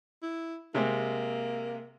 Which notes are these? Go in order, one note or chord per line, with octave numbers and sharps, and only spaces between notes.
E4
C3 G#3 A#3 C4